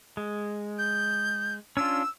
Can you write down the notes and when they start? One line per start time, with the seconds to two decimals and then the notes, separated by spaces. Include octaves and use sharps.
0.17 G#3
0.79 G6
1.77 C#4 D4 F4 E6